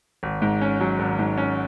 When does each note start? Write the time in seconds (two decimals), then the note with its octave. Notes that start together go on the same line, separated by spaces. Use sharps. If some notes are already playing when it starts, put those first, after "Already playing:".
0.23 G#1
0.42 G#2
0.61 C#4
0.81 F#3
0.99 G#1
1.19 G#2
1.38 C#4